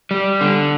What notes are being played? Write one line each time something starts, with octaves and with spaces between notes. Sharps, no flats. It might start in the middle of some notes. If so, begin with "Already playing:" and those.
G3
D3